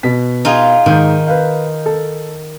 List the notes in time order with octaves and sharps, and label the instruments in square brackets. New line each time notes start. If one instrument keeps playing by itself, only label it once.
[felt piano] B2 B6
[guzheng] D#4 F4 G#4
[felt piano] G#2 G6 [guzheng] D#3
[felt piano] B4 F5
A4